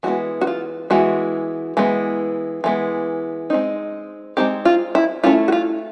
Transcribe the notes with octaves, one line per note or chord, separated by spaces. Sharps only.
E3 G#3 B3 F#4
F#4
F4
E3 G#3 B3 F#4
E3 G#3 B3
E3 G#3 B3
G#3 C4 D#4
G#3 C4 D#4 G4
F4
E4
A3 C#4 E4 F4
F#4
F4